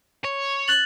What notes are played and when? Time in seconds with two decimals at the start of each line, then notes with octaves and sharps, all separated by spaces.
0.24 C#5
0.68 F#6 A6 F#7